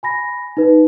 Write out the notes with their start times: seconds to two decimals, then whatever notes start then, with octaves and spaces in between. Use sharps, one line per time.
0.03 G#5 B5 A#6
0.57 D#4 B4